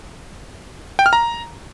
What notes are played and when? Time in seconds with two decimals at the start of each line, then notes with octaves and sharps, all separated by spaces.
0.99 G5
1.06 F6
1.13 A#5